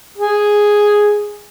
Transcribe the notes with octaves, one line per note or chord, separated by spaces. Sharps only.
G#4